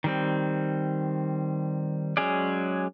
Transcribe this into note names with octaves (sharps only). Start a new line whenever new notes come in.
D#3 G3 C4
F#3 G#3 C#4 G#4 D5